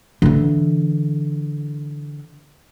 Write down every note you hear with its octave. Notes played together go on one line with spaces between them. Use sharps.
D3 E3